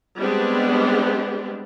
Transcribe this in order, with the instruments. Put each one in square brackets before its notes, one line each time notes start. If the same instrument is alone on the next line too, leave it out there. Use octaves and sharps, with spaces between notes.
[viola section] G3 G#3 B3 C4 D4 G4